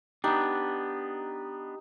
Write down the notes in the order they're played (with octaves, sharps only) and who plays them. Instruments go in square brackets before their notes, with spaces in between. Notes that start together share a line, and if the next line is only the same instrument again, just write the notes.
[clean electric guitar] B3 D4 [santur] D#4 [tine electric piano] G4